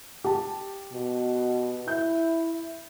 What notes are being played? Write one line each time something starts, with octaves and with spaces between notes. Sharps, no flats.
G4 A5
B2
E4 G6